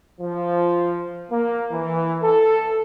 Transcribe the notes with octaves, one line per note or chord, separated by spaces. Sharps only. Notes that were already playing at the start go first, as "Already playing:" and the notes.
F3
A#3
E3
A4